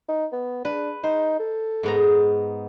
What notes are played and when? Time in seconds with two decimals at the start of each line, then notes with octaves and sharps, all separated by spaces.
0.09 D#4
0.32 B3
0.65 D4 B4
1.03 D#4 C5
1.40 A4
1.83 G#2 B3 A#5